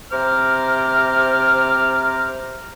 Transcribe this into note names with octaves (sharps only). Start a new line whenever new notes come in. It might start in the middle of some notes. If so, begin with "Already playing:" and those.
C3 C5 A#5 D6 F6